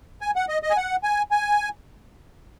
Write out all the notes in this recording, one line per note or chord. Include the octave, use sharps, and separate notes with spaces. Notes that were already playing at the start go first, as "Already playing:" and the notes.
G#5
F#5
D#5
D#5
G#5
F#5
G#5
G#5